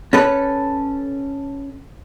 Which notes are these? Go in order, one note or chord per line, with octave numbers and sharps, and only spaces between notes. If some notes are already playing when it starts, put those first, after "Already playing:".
C#4 A4 B4